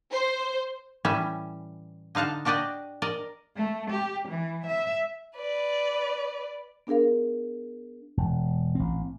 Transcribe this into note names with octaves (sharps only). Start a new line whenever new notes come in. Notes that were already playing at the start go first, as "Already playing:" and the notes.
C5
A2 E3 G3 C#4 E5
D3 D#4 F5 F#5 A5
D4 F#4 G4 D5 D#5
A#4 D5 D#5
A3
G4
E3
E5
B4 D5
B3 D4 G#4 A#4 F5
E1
A1 C4